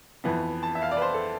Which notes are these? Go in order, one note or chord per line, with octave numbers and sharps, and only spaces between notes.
F2 E3 B3
A5
E5
F5
D5
B4
C5
A4